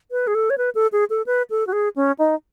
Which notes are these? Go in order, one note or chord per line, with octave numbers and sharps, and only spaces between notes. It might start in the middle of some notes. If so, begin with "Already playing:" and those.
B4
G#4
A4
C#5
B4
A4
G#4
A4
B4
A4
F#4
G#4
C#4
D#4